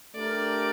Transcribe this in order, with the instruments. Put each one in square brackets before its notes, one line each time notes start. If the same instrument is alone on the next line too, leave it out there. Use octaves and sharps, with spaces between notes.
[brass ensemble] A3 D4 G4 A#4 [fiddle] D5